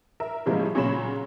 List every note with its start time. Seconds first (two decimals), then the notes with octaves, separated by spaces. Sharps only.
0.20 A#4 E5
0.46 A2 C#3 F3 G3 G#3 A#3
0.75 A#2 C#3 F#3 C#5 B5 E7